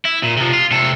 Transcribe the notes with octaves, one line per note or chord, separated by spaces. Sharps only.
E4
A#2
C3 F3
F4
C3 A4